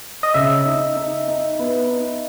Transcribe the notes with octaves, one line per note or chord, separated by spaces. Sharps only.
D#5
C#3 E5
D#4
D#4
D#4
B3
D#4